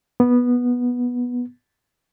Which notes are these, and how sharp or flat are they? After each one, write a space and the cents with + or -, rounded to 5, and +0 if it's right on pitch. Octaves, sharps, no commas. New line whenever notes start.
B3 -10